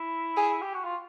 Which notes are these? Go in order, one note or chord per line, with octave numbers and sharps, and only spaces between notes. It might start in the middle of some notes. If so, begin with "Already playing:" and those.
Already playing: E4
G#4
G4
F#4
F4